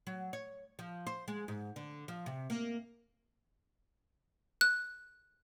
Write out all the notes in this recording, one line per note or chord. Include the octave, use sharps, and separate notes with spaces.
F#3
C#5
F3
C5
G#3
G#2
D3
F3
C3
A#3
F#6